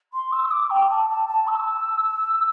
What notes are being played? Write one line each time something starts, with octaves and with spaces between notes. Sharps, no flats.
C6
E6
E6
D6
G5
A5
A5
A5
E6